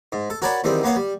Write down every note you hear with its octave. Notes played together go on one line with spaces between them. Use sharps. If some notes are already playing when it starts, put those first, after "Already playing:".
G#2
A4
F#4 A#4 C#5 D5 A5 B5
E2 D#3 G3 C4
A#3 B3 C#5 F5
G3